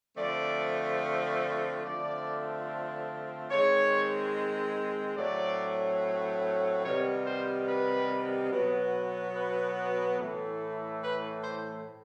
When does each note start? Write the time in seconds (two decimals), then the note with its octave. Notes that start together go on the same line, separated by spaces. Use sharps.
0.16 D3 F3 A3 C4 D5
1.83 D3 F3 A3 C4 D5
3.50 D#3 G#3 C4 C#5
5.17 A2 F#3 A3 C4 D5
6.84 C3 D#3 G3 B3 C#5
7.26 C5
7.68 B4
8.51 B2 F#3 B3
9.35 B4
10.19 A2 E3 A3
11.02 B4
11.44 C5